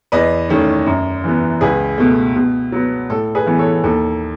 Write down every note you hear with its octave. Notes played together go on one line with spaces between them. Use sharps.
E2 B4 D#5
D#3 A3 C#4
F#2
E3 B3
C#2 G#4 B4
B2 A3
B2
F#3 B3
A2 A4
G#4 B4
E3 B3
A4 C#5
D#2 A4